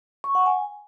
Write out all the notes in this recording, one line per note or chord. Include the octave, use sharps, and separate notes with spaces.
C#6
F#5
G#5